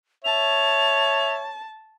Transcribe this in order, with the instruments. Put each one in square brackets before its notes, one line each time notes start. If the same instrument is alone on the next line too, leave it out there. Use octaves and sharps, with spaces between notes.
[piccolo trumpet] C#5 [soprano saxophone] E5 [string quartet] A5 [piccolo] F7